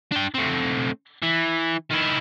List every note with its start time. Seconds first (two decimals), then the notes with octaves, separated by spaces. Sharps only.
0.12 D4 G5
0.34 A3 C4
1.23 E3
1.91 D#3 E4